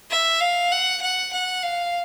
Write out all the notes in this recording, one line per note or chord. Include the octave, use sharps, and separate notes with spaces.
E5
F5
F#5
F#5
F#5
F5